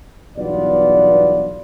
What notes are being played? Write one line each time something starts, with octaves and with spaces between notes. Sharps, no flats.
B1 E2 G2 B3 F4 D5